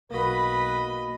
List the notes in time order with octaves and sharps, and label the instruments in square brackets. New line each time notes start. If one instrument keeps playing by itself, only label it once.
[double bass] B1 [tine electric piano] A#3 F#4 [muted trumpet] B4 [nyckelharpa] D#5 B5